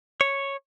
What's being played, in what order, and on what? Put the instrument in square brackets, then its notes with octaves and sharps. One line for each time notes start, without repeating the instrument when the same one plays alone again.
[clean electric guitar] C#5